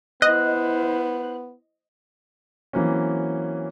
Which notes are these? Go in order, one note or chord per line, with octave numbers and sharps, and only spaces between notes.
B3 E4 C5 D#5 F#6
E3 F#3 A#3 C4 C#4